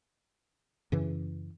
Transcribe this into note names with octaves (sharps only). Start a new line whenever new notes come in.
F#2 C#3 E3